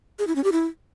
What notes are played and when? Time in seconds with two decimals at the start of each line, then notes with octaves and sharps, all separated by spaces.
0.19 G#4
0.27 E4
0.35 C#4
0.44 G4
0.52 E4